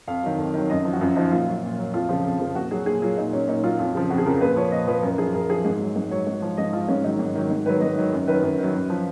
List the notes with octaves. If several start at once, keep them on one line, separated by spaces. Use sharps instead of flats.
F2 F5
D#3 F#3
F2
D#3 F#3
F#2 D#5
F3
F#4
F#2 F4
F3 D#4
A#2 F4
F#3
A#2
F#3
F2 F4
C#3 F3
F2
C#3 F3
A#2 F#4
F#3 G#4
A#2 G#4
F#3 F4
A#2 D#4
F#3 C#4
A#2 D#4
F#3 F4
F2 F4
C#3 F3
F2 F#4
G#4
C#3 F3 A#4
A#2 B4
F3 C#5
A#2 D#5
F3 B4
F#2 A#4
F3 G#4
F#2 A#4
F3 G#4
G#2
F#3
G#2
F#3 C#5
G#2
F3
G#2 D#5
F3 F4
G#2 C#4
D#3 F#3 D#4
G#2
D#3 F#3
G#2 D#4
D#3 F#3 B4
G#2 D#5
D#3 F#3
F#2
D#3 F#3 B4
F#2
D#3 F#3
F#2
F3